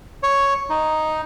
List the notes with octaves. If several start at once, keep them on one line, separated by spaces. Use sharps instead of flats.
C#5
D#4